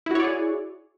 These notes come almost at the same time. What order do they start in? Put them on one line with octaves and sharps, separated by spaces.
E4 F#4 C#5 D5 G#4